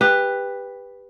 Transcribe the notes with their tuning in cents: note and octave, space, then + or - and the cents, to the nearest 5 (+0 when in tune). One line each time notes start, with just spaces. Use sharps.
G4 +20 B4 +0